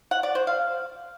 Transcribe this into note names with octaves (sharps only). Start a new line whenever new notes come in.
F#5
D5
C5
F5